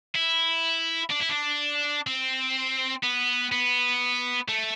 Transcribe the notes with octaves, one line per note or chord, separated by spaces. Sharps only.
E4
D4
E4
D4
C4
B3
B3
A3